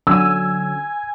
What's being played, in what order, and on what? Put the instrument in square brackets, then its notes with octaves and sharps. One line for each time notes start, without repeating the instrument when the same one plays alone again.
[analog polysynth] D3 F#3 C#4 [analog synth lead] G#5 [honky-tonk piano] E6